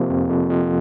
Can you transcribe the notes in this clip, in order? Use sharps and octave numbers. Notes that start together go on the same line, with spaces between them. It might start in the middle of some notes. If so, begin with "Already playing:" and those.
Already playing: C3 F3 A#3
F2
F2
F2